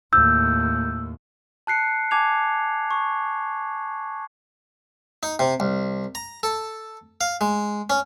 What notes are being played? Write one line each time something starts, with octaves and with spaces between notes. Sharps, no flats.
D#2 A2 E6 G6
A5 F#6 C7 C#7
G#5 A5 D6 G#6 F7
C#6
D#4
C3
C2
A#5
A4
F5
G#3
C#4